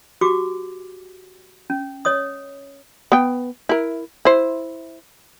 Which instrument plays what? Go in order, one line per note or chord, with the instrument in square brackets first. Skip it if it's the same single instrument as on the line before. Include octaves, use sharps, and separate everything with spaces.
[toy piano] F#4 G4 D6
C#4
C#5 D#5 D#6
[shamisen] B3 G5
E4 A#4
E4 C5